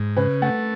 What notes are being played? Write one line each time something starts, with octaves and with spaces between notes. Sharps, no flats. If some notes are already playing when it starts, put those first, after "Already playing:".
Already playing: G#2
C#3 B4
A3 F#5